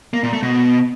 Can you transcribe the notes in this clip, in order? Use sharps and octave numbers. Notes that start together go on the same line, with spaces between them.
A#3
A#2
A3
B2